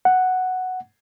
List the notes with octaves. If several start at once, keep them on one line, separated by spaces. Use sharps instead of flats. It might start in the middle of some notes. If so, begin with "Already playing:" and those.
F#5